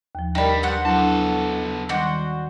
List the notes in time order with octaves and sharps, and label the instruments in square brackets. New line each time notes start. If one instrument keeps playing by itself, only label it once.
[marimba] D#2 F3
[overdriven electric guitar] G2 G3 [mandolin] D#4 B5 [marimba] A#4 D5 G5
[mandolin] F#4 C5 F#5
[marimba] F#3 D4 E4 [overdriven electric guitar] B3 A4
[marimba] D#3 G3 [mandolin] D4 F#4 C5